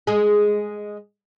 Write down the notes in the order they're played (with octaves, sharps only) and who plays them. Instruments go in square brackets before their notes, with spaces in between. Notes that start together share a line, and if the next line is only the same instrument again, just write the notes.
[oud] G#3 G#4